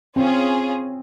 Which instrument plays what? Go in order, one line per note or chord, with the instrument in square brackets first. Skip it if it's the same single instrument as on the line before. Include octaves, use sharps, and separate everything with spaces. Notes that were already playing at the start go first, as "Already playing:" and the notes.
[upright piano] C4 [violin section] C#4 F4 G#4